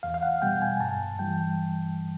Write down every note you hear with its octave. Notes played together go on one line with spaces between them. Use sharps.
E2 F5
F5
F#5
B2 G3 G5
G#5
G2 A5
E3 G3 G5